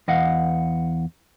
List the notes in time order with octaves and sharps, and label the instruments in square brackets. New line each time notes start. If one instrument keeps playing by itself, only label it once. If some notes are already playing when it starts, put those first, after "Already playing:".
[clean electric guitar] E2 D#5 F5 F#5